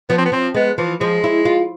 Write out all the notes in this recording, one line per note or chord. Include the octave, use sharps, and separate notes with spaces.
F3 B3
C4
B3
F3 C4
G#3 B3
E3 F3
F3 G#3
E4
F4